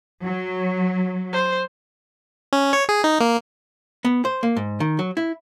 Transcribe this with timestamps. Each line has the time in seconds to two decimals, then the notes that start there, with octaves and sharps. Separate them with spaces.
0.23 F#3
1.33 C5
2.53 C#4
2.73 C#5
2.89 G#4
3.04 D#4
3.20 A#3
4.05 B3
4.25 C5
4.43 A#3
4.56 G#2
4.80 D#3
4.99 F#3
5.17 E4